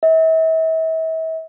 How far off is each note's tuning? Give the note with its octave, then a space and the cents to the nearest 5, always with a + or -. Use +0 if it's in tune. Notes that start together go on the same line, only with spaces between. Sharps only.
E5 -40